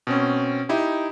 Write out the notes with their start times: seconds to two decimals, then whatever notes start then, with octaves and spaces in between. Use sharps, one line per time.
0.07 B2 C4 C#4
0.69 D#4 E4 G4